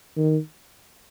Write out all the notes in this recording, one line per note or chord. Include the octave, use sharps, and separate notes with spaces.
D#3